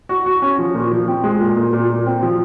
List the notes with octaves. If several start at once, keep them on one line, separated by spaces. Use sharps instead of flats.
F#4
F#4
C#4
F3
A#2
F3
C4
G#3
A#2
A#2
A#2
A#2
C4
F3